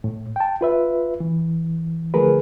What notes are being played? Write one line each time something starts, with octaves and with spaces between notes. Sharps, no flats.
A2
G5 A5
F4 B4 E5
E3
D3 F3 A3 G#4 A#4 B4